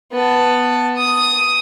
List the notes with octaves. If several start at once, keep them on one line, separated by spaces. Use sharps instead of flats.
B3 A5
D#6